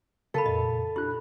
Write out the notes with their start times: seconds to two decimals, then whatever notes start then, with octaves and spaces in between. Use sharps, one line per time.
0.34 C#3 A4 A#4 F5 A5 B5
0.46 F2 A#2 D#5
0.96 D4 E4 F4 G4 F#6